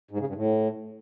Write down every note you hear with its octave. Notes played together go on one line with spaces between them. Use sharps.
G#2
C#3
G2
A2